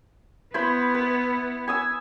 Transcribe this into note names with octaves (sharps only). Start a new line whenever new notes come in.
B3 E4 C5 B5
B4
G#5 D#6 E6